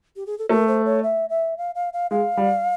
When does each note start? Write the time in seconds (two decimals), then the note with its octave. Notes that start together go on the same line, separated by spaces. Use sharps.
0.16 G4
0.26 G#4
0.38 A4
0.49 A3 A#4
0.68 C5
0.85 C#5
1.03 E5
1.30 E5
1.57 F5
1.75 F5
1.93 F5
2.11 G#3 F5
2.37 G3